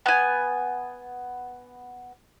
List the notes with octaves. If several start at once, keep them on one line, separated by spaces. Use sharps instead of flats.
B3 G#5